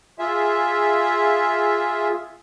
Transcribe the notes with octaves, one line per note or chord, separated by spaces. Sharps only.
F4 G#4 E5